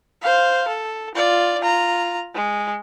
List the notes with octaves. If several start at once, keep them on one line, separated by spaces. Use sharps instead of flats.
C5 F5
A4
F4 D5
F4 A#5
G#3